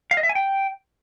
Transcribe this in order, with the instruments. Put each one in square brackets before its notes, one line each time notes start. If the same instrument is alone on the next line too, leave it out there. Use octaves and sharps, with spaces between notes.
[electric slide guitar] F5
D#5
E5
G#5
G5